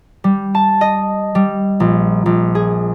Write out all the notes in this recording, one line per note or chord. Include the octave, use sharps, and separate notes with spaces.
G3
A5
D#5
G3
A#1
A#1
G#4